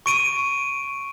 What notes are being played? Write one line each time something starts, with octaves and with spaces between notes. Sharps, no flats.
C#6 D7 D#7